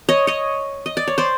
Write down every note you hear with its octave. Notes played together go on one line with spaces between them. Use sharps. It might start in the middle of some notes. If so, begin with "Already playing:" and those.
C#5 D#5
C#5 D#5
D#5
D5
C#5
C5 D5